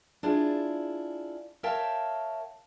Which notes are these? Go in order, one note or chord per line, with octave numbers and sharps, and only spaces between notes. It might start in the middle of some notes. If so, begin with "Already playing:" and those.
D4 E4 F4 G#4 D5
A#4 C#5 E5 F5 G5 A5